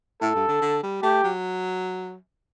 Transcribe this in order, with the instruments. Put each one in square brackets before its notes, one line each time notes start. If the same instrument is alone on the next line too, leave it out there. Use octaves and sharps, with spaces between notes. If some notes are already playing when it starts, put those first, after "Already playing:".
[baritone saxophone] A2 [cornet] A4
[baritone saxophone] G2
D3
D3
G3
[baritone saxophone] A3 [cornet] G4
[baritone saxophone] F#3